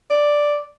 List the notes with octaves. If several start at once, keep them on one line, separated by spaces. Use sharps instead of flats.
D5